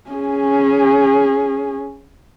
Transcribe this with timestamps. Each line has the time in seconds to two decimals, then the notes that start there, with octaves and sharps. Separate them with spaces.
0.10 C#4 G#4